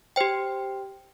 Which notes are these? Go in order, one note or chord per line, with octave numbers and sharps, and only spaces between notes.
G4 C5 G5